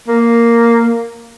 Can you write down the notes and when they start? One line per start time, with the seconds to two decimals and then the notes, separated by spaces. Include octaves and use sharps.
0.08 A#3